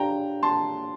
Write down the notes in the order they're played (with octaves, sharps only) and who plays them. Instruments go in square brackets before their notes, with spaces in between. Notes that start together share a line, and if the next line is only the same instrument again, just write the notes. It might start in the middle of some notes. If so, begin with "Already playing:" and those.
Already playing: [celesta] D4 G4 D5 F5 [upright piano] G5 A#5
[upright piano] A5 C6